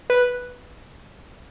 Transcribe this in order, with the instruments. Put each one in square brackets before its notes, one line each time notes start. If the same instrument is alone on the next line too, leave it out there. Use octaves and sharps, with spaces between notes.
[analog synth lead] B4